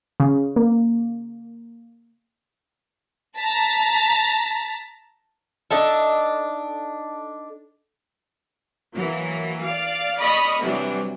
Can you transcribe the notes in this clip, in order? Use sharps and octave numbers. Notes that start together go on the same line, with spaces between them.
C#3
A#3
A5 A#5 A6 B6
D4 D#4 A4 E5
E3 F#3 A#3
D5 F5
D5 D#5 B5 C#6 D#6 F6
C3 E3 F#3 G3 D4